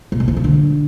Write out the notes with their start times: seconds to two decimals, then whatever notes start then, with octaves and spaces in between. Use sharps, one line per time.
0.12 A#2
0.20 B2
0.28 C3
0.37 C#3
0.44 D3